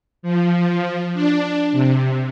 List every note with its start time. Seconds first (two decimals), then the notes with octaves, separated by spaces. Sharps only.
0.23 F3
1.14 D4
1.72 C3